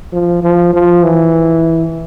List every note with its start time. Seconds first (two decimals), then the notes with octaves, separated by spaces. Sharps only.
0.13 F3
0.43 F3
0.73 F3
1.03 E3